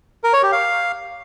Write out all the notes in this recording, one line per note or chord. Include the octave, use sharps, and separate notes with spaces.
A#4
C#5
G4
F5